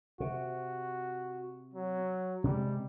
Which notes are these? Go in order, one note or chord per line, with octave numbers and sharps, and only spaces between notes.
C3 F#4
F#3
C3 G3 G#3